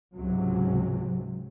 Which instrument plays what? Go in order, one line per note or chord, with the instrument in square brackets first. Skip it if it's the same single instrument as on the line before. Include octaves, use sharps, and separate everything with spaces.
[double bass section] C#2 G#2 C3 F#3